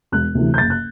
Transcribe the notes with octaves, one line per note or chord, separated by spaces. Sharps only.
E1 F#6
D2 C3 E3
G6
F#1 A6
F#6